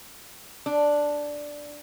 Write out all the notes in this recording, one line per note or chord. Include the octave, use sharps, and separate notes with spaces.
D4